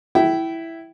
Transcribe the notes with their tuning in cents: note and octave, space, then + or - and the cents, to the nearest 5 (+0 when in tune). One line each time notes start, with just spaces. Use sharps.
E4 +0 G5 -25